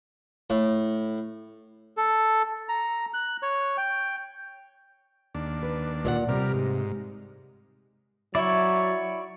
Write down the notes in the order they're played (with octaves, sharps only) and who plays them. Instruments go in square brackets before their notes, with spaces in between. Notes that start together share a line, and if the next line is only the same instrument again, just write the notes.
[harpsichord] A2
[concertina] A4
A#5
F#6
C#5
G5
[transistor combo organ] D#2 D4
[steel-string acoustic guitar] B4
A#2 D5 F#5
[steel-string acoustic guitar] C3 [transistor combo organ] G3 A#4
[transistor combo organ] G#2
[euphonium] F#3 [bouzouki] E4 [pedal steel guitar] C#5 D5